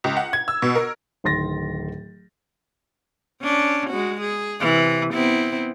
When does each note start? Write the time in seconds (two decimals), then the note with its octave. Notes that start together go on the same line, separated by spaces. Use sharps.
0.04 C#2
0.17 F#5
0.33 G#6
0.48 E6
0.62 B2
0.75 A#4
1.24 D1 D#3 C6 A6 A#6
3.42 C#4 D4
3.90 G#3 F#4
4.21 G#4
4.61 C3 E3
5.13 B3 C4 E4